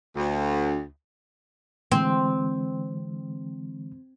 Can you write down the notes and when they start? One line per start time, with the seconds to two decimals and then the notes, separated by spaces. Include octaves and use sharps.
0.16 D2
1.92 D3 E3 G#3 C4